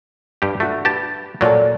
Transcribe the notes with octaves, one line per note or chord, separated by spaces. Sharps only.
G2 G4
A3 D4 F#4
G4 B4 A5
A#2 F#3 A4 C#5 D5